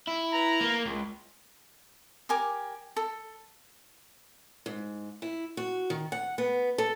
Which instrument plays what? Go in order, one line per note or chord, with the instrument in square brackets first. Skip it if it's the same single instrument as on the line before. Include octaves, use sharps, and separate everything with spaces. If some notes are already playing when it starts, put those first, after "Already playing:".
[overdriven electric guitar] E4
[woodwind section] B4 A#5
[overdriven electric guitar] A#3
C#2
[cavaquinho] G4 A#4 G#5 D6
A4
[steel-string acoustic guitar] G#2
E4
F#4
D#3
F#5
B3
A4